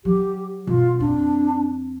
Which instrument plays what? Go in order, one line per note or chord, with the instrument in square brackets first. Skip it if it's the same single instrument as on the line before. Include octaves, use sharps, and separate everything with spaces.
[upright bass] F#3 [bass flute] G4
[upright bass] B2 [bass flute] F4
[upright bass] F2 C4 [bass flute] D4